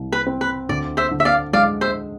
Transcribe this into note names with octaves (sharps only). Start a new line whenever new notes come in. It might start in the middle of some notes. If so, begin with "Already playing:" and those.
Already playing: C2
B4
C4
B4
D2 D5
C5 E5
D3
E5
D5 F5
G#3 D5 F5
C5 E5